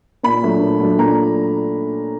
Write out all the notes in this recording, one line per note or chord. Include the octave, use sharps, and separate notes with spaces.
A#2 B5
F#3 A3 D4
A#2
F#3 A3 D4
A#2 A#5